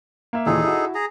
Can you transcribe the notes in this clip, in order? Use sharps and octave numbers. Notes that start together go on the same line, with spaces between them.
A#3 E5
D#2 A#2 E3 D#4 G#4 A4
E4 F#4
G#4 A#5